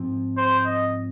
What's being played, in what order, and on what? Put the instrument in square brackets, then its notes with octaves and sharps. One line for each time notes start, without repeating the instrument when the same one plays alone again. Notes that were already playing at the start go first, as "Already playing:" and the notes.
Already playing: [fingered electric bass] G#2 F3 C4
[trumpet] C5
D#5